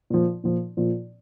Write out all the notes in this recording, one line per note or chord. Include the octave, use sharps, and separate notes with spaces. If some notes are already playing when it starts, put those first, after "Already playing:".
A#2 F3
A#2 F3
A#2 F3